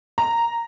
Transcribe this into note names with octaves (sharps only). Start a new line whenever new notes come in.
A#5